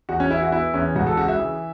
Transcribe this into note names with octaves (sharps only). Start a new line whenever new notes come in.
E2 F#4
C#4
E3 E4
F#4
B3 E4
E2 C#4
C#2 F#4
A4
C#3 F#4
E5
E3